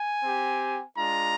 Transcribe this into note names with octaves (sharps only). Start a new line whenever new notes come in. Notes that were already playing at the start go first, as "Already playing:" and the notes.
Already playing: G#5
C4 G4
G#3 D4 F4 A#5